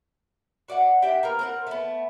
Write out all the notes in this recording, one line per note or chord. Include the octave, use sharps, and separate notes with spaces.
F#4 D5 F5 F#5
D4 G4 E5 G5
A#3 B3 A#4
C4 A#4 F#5
A3 B3